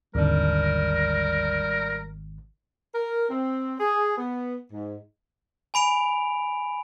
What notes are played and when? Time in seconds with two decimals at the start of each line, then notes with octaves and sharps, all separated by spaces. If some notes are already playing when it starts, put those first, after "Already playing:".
0.15 G#1 D#2 D3 G3 A#4
2.94 A#4
3.29 C4
3.80 G#4
4.17 B3
4.71 G#2
5.74 G#5 B5 D7 F7